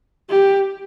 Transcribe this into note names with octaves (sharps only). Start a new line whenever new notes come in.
G4